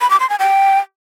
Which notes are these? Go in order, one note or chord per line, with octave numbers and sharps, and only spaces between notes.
B5
D6
C6
G#5
G5